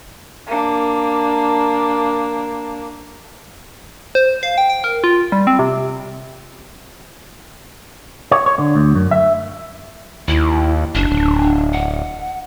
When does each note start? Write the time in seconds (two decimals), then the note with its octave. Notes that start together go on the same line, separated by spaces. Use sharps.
0.47 A#3 D4
4.15 C5
4.43 F5
4.58 G5
4.70 G5
4.84 A#4
5.04 F4
5.32 G3
5.47 C4
5.59 C3
8.31 C#5
8.46 C#5
8.58 D3
8.75 D2
8.95 F#2
9.11 E5
10.28 D#2 E4
10.95 F#1 D4
11.12 D1
11.73 F#5